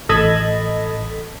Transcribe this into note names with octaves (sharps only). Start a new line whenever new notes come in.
A1 A4 D#5 A5 B5 G#6